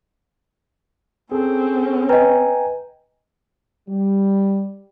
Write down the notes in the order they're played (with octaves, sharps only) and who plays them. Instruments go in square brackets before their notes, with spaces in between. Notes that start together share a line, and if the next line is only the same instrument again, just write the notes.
[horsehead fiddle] C4 C#4 [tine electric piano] G#4 A4
[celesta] B4 D#5 [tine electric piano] G5 G#5 A#5
[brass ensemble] G3